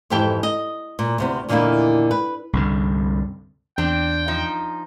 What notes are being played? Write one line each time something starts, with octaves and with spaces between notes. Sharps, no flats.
F2 G#2 E3 G4 A4 G5
D#5
A#2
D2 C3 B3
E2 A#2 D3 D#3 A#3 E4
B4
C2 G2 D3
E2 C4 D4 G5
F3 D#4